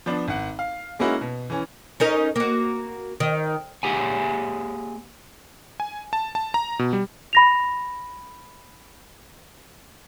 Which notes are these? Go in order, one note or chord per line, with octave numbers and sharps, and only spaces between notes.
F3 B3 D4
G#1 F#5
F5
G#3 A#3 C#4 D#4 E4 F#4
B2
E3 C#4
C#4 D#4 A#4
A#3 F#4
D#3
A#3 G4 G#4 F#5 G#5
G#5
A5
A5
A#5
B2
G3
B5 A#6 F7